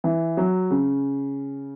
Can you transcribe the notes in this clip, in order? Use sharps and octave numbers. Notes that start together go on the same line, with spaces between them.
E3
F#3
C#3